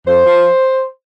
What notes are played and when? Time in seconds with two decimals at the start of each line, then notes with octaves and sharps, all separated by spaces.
0.06 F2 C5
0.26 F3